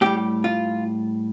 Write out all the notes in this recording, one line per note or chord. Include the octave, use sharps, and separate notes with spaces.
A2 G3 G4
F4